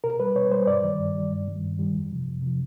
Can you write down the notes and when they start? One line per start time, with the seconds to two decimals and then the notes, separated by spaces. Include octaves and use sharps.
0.04 B2 A#4
0.20 G3 B4
0.36 B2 C#5
0.51 G3 C5
0.67 G2 D5
0.84 D#3 G3
1.00 G2
1.15 D#3 G3
1.31 G2
1.48 D#3 G3
1.64 G2
1.79 D#3 G3
1.95 F2
2.12 C3 F3
2.27 F2
2.42 C3 F3